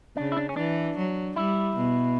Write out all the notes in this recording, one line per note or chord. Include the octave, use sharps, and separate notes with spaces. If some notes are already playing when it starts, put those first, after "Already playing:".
C#3 D4
E4
D4
C#4
E3 D4
F#3
G3 E4
B2